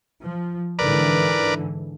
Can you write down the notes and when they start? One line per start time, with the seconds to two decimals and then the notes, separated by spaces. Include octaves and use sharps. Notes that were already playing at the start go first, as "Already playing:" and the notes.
0.21 F3
0.79 G#2 D3 E3 A#4 B4 D5